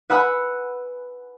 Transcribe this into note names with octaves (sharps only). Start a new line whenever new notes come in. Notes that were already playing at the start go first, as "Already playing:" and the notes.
B4 F#5 G#5 B5 E6 F#6